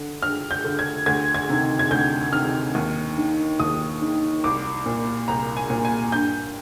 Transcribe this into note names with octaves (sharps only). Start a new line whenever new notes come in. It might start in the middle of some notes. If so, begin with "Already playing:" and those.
Already playing: D3
G2 F6
G6
D3
G#6
D2 G#6
G#6
C3 D#3
G#6
D2 G6
C3 D#3 F6
D#2
D#3
D#2 D#6
D#3
C2 D6
A#2
C2 A#5
G#5
A#2
G#5
G2 G6